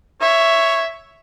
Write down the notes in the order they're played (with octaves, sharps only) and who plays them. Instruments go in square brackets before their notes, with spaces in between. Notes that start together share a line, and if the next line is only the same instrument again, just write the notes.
[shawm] C#5 [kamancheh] E5